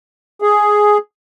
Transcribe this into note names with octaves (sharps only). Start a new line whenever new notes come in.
G#4